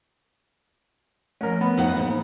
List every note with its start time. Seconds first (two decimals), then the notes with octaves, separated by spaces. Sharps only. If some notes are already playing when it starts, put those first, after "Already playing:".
1.41 F3 A3 C#4 A#4
1.61 B3 B5
1.77 F2 D#4 F#5
1.97 G#2 E3 G#3 A#3